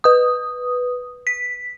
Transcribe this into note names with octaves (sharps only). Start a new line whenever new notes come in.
B4 D#6
B6